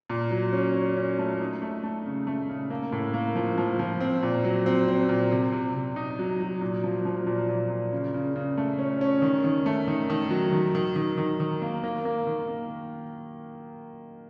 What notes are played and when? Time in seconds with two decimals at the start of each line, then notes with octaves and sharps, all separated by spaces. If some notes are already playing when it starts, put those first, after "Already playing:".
0.10 A#2
0.31 F#3
0.53 C#4
0.75 C#4
0.97 C#4
1.19 A3
1.40 D#4
1.62 A3
1.83 A3
2.06 C#3
2.27 A3
2.49 C#3
2.70 A#3
2.92 A2
3.14 A#3
3.36 F3
3.58 F3
3.79 F3
4.00 C4
4.23 A#2
4.44 F#3
4.66 C4
4.88 C4
5.09 A#2
5.32 C3
5.52 C3
5.74 C3
5.96 D#4
6.19 F#3
6.40 F#3
6.61 A#2
6.84 F3
7.05 F3
7.27 A#2
7.49 A#2
7.70 A#2
7.92 C#3
8.14 C#3
8.36 C#3
8.58 A3
8.79 C#4
9.01 C#4
9.22 D#3
9.44 D#3
9.66 A3
9.88 D#3
10.10 D#3
10.30 F#3
10.53 D#3
10.75 D#3
10.96 D#3
11.18 D#3
11.40 D#3
11.62 A#3
11.84 A#3
12.05 A#3
12.27 D#3
12.48 A#3